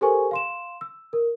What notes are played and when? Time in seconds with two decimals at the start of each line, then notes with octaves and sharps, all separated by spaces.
0.01 G4 A4 A#4 C5 G#5 C#6
0.31 F5 C6 E7
0.81 E6
1.13 A#4